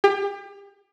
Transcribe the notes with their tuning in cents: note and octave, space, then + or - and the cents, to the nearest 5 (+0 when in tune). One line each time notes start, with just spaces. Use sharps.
G4 +35